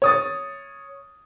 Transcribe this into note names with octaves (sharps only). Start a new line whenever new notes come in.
C#5 D#6 A6